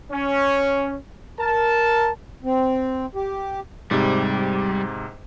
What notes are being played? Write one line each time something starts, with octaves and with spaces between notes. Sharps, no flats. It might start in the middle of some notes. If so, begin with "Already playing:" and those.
C#4
A#4 A5
C4
G4
G#2 C3 G3